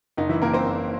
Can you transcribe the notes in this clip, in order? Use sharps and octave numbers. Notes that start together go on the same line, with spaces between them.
F#1 D#4
E3 E4
F#1 A#3 A#4
C4 C5
F#1